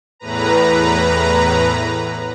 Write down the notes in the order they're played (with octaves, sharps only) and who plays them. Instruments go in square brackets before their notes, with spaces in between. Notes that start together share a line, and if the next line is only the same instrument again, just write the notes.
[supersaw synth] E2 A2 B4 A#5